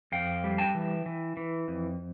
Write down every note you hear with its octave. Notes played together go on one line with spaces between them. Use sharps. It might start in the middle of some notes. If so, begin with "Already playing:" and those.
F2 F5 G5
G3
G5 A5
E3
E3
E3
F2